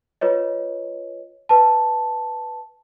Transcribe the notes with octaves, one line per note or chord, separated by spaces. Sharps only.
F4 B4 C#5 D#5
B4 A5